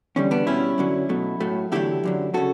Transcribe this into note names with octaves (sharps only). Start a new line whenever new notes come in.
E2 D3 G3 C#4
B3 D4
B2 G3 C#4 E4
F#2 D3 F#3
B2 F#3 A3
A2 F#3 A3
E2 D3 F#3 A3 E4 G4
F#2 D3 F#3
C#3 F#4 A4